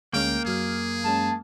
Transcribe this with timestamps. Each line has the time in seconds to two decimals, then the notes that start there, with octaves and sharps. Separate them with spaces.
0.13 D2 G#3 A#3 C#4 F5 G5
0.45 F#2 F#3 G#4 F6
1.04 F#2 G#3 C#4 A5